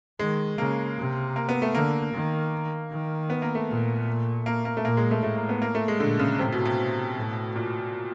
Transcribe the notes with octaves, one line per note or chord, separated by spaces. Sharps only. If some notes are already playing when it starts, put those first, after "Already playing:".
D#3 G#3
C#3 A#3
C3
A#3
B3
A3
D3 A#3
D#3
D#3
B3
A#3
A3
A#2
A#3
A#3
A3
A#2 A#3
G#3
A3
A2 A3
A#3
B3
A#3
A3
G#3
A#2 D3
C#3
A2 C3
B2
B2
A2
A#2